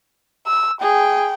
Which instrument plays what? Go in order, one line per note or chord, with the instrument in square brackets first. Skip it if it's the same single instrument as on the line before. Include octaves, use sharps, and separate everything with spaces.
[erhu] E6
[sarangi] G#4 [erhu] G5